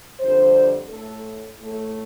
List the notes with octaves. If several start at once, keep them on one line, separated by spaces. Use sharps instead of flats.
F2 D3 G3 C5
A2 A3 A4
A2 A3